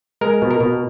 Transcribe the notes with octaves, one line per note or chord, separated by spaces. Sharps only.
G#3 A#4
B2
A#4
B2